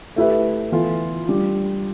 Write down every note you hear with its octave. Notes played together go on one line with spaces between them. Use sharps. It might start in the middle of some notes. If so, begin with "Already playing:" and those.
A3 E4 G4 B4
E3 B3 F4 A4
G3 D4 F4